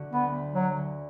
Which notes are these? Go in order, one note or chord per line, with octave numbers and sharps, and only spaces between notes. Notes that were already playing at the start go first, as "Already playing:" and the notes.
Already playing: D3 A3 F#4
D2 B3
A3
F#3 F#4
D3